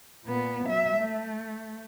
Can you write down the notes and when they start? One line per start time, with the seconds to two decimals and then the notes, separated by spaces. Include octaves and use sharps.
0.25 A#2 B3
0.66 F#3 E5
0.97 A3